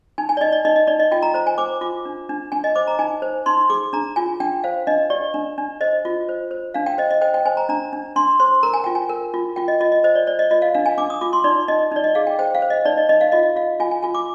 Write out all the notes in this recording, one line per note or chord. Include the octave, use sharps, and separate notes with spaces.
D#4 G#5
G#5
D5
D#4 D#5
D5
D#4 D#5
D#5
D#4 D5
D#5
F4 G5
A#5
C5 A#5
G#5
C5 D6
F4 D6
D4
D4
D4 G#5
D#5
C5 D6
A#5
D#4 G#5
C5
D#4 C6
G#4 D6
D4 A#5
F4 G#5
D4 G5
C5 F5
D4 D#5
G4 D5
D4
D4
C5 D#5
F4
C5
C5
D4 F5
G5
C5 D#5
D#5
C5 G5
G5
C5 G#5
A#5
D4 A#5
D4
D4 C6
C5 C6
A#4 A#5
G#5
F4 G5
G#5
A#4
F4
F4 G5
D#5
F4 D#5
D#5
C5 D#5
D5
C5 D5
D#5
F4 D#5
F5
D4 F5
G#5
D4 D6
D#6
F4 D6
C6
D#4 D5
D#4 D#5
D#4 D5
D#5
G#4 F5
G5
C5 G5
F5
C5
D#5
D#4 D5
D#5
D#4 D#5
F5
F4 D#5
F4 F5
F4 G#5
G#5
F4 G#5
D6